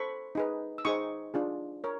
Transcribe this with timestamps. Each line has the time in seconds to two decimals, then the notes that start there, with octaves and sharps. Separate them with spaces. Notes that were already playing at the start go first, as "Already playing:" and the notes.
Already playing: A4 C5 B5 C#6
0.35 D#4 G#4 B4
0.78 E6
0.85 D#4 G#4 C5 C#6 D#6
1.34 D4 F4 G#4
1.84 A#4 C#5